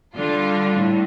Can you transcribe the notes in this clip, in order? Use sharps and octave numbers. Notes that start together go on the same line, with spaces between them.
D3 G3 D4 F4
A2